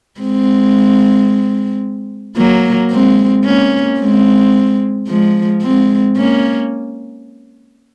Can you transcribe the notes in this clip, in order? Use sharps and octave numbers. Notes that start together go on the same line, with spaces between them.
G#3 C4
F#3 A#3
G#3 C4
A#3 C#4
G#3 C4
F3 G#3
G#3 C4
A#3 C#4